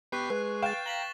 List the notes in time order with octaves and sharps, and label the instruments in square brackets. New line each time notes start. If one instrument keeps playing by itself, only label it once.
[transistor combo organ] B3 G4 B4 [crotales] C#6 F#6 C7
[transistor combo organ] G#3 [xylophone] B4
[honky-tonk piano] F5 G5 [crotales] A6 E7
[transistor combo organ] A#5 [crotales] B6 F#7 G7